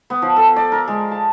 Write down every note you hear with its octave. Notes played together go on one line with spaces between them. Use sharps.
B3
F3
A4
D5
A#4
G#3
A5